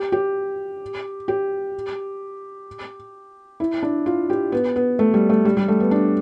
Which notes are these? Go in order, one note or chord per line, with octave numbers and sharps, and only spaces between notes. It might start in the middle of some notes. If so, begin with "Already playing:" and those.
Already playing: G4
G4
G4
E4
D4
F4
G4
B3
B3
A3
G3
A3
G3
G3
A3
B3
D4